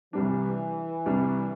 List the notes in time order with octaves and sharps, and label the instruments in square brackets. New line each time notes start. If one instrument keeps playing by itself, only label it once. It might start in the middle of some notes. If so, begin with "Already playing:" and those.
[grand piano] C2 C3 G3 D4 [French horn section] E3
[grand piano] C2 C3 G3 D4